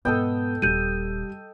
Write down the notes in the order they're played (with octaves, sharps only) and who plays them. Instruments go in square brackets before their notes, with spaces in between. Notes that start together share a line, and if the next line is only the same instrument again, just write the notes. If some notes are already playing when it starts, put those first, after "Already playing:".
[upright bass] G#2 B2 [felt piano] B3 [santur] A4 D#5 G5
[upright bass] D#1 A#2 [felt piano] G3 [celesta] G6 D#7